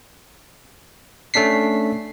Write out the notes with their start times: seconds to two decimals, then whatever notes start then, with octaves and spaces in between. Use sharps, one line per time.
1.34 A3 C#4 D4 B6 C7